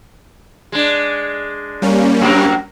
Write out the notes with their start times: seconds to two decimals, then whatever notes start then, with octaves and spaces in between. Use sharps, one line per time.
0.72 G#3 D4
1.82 G3 A#3 C#4
2.21 F#2 F#3 A#4